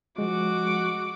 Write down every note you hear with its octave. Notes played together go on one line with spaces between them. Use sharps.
F3 G#3 F#4 D6